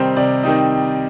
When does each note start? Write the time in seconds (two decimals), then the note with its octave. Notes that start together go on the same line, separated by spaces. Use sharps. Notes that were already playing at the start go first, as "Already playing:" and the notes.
Already playing: C3 D#3 G3 C4 D#4 C5 D#5
0.16 C3 D5
0.43 D#3 G3 C4 D#4